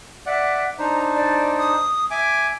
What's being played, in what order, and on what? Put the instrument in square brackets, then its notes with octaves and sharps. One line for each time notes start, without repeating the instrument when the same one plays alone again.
[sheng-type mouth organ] D5 F#5 [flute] E5
[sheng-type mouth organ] D4 D#4 C5 [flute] A#5
[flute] D5
D#6
[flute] E5 [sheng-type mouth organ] G#5 D6